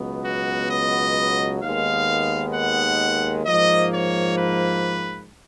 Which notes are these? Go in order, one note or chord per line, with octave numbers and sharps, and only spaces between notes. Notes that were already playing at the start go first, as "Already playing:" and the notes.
Already playing: C#2 B2 F#3 B3
F#4
D#5
D#2 D#3 G#3 B3 F5
F#5
G#2 F3 A#3 D#5
C#5
B4